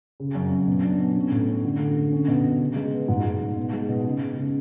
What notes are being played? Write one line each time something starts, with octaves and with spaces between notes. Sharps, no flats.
C#3
F#2
F#2
B2
D4
B2
C#4
A2
C#4
D3
D3
D3
C#4
B2
B2
C#3
G#3
B3
G#2
G#2
G#2
B2
G#3
B2
C#3
C#3
C#3